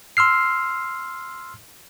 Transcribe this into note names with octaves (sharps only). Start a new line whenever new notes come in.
C6 E6 F6 C7